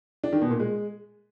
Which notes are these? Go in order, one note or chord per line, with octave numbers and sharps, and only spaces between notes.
D4
D#3
B2
A#2
G#3